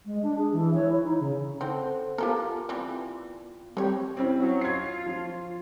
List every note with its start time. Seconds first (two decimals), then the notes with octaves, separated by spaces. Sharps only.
0.06 G#3
0.23 D4
0.38 G#4
0.53 E3
0.75 C#5
0.89 E4
1.04 D#4
1.20 C#3
1.61 C4 A4 C5 F#5
2.18 B3 F4 G4 A4 A#4
2.69 E3 G3 C4
3.77 G3 C4 G4 C#5
4.17 C4 C#4 E4
4.39 F#3
4.61 F4 G#6 C7
5.06 F3